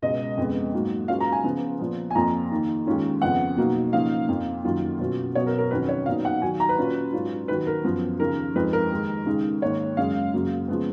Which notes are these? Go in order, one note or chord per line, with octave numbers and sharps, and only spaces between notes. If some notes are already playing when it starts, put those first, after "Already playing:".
C#2 B2 G#3 D#5
F2 C#3 G#3 B3
G#2 F#3 A#3
C#2 C#3 F#3 C#4 F4 F5
A#5
G#5
C#3 F3 B3 F4
A#2 F3 B3
G#5
F2 F3 A#3 F4 A#5
D#2 D#3 A#3
D#2 D#3 G#3 C#4 F4
F2 C#3 F3 B3 F#5
B2 F#3 A#3 D#4
C#3 F3 A#3 D#4 F5
F2 F3 A#3
F#2 D#3 F#3 A#3 F4
B2 F#3 C#4 F4
B2 F#3 B3 C#5
A#4
A#4
F2 D#3 F#3 C#4 B4
C#5
A#2 F#3 B3 D#4 F5
F#5
D#2 D#3 F#3 G#5
A#5
B4
A#2 F#3 C#4 F4
G#2 F#3 C#4 F4
D#2 D#3 F#3 B4
A#4
F#2 F3 B3
D#2 C#3 F3 A#4
F2 F3 G#3 D#4 B4
A#4
D#2 D#3 G#3 D#4
D#2 C#3 G#3 D#4
G#2 D#3 A#3 C#5
F#2 C#3 G#3 F5
F#2 C#3 F#3 A#3
C#3 F3 G#3 B3